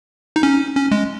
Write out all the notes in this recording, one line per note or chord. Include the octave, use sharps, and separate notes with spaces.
D#4
C#4
C#4
G#3